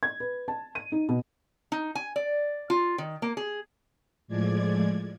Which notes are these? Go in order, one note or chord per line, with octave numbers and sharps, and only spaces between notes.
G#6
B4
A5
D#7
D#4
B2
D#4
G#5
D5
F4
D#3
A#3
G#4
A2 F3 G#3 D5 G#6